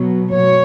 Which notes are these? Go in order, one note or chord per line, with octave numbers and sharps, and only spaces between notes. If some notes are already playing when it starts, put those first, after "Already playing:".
Already playing: B2 F#3
B2 F#3 C#5